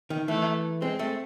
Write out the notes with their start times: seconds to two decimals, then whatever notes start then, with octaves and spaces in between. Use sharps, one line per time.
0.10 D#3
0.28 E3 A3
0.82 G#3 C4
0.99 A3